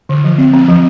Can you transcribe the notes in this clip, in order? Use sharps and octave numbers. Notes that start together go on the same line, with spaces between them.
D3
F3
C4
C4
F3